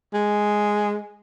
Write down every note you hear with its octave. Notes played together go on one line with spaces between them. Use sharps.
G#3